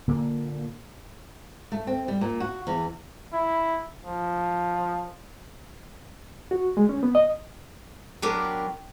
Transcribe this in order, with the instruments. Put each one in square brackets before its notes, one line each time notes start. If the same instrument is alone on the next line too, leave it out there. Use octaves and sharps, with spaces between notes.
[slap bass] A#2 D3 A#3
[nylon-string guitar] A3
C4
G3
A#2
F#4
E2
[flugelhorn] E4
F3
[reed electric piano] F#4
G#3
C#4
B3
D#5
[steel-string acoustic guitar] F#3 B3 D4 G4 A#4 G5